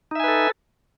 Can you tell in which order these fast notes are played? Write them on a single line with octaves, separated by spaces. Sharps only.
D#4 E5 G#5 B4 A4